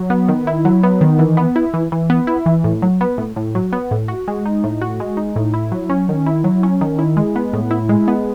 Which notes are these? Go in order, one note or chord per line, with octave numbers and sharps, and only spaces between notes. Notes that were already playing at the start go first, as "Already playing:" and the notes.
Already playing: F#3
B3
D#3
E4
F#3
B3
D#3
E3
B3
E4
E3
E3
B3
E4
E3
A2
F#3
B3
A2
A2
F#3
B3
A2
F#4
G#3
D#4
A2
F#4
G#3
D#4
A2
E4
F#3
C#4
D#3
E4
F#3
C#4
D#3
E4
G#3
B3
A2
E4
G#3
B3